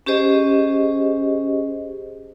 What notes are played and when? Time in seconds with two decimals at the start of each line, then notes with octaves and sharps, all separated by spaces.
0.06 C#4 G4 G#4 C5 D#5